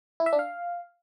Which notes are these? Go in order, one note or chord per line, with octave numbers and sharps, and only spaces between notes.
E4
E5
D4
F5